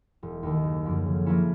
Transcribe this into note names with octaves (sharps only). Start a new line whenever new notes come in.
E1
D#2 D#3
F#1
F#2 D3 F3 A#3
C#3
F3 A#3 C#4 E4